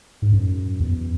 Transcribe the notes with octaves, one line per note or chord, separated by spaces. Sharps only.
G#2
F#2
E2